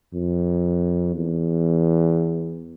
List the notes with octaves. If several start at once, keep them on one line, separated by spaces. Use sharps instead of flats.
F2
E2